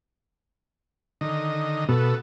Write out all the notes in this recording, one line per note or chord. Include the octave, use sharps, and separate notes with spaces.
D3 D#3 D#5
B2 B3 A4